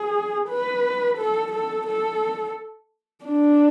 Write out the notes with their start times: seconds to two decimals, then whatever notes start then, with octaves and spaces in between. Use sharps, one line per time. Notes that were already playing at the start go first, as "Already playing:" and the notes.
Already playing: G#4
0.49 B4
1.18 A4
1.52 A4
1.87 A4
3.25 D4